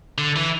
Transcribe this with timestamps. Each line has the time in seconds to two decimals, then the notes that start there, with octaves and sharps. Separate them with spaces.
0.18 D3
0.36 E3